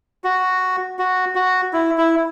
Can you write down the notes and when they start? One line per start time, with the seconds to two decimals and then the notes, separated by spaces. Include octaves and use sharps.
0.24 F#4
0.99 F#4
1.35 F#4
1.73 E4
1.98 E4